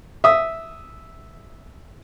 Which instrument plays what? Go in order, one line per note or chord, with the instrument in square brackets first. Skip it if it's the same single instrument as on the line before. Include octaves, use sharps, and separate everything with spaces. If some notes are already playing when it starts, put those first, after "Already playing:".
[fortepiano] E5 D#6